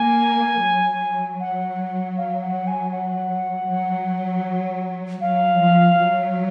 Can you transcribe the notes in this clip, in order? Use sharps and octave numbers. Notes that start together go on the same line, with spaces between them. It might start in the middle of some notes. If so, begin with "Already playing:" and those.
Already playing: A#3 G#5
F#3
F#5
F5
F#5
G#5
F#5
F#3
F#3 F5
F3
F#3